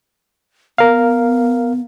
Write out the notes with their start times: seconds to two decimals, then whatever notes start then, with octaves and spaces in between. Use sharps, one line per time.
0.78 B3 A#4 F5